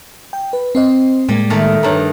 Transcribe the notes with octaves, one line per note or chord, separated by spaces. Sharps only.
G5
B4
C4 C5 D#5
A2 G3 G#3 A#3
D#3 A3 A#4
G2 D#3 C#5 A#5